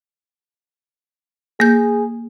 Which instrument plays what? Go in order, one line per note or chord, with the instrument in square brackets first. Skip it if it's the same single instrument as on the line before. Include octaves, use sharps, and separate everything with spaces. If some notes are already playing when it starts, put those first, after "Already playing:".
[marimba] A#3 G6 [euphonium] G#4